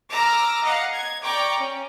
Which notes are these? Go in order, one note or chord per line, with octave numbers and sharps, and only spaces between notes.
A#5 D6 E6 F6
D#5 F5 F#5 A#5 C#7
G#6
D5 G5 A#5 C#6 D6
C#4